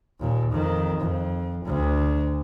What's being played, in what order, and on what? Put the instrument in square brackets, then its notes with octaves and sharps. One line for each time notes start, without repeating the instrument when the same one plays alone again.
[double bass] D#2 A#2
F2 D#3
F2
D2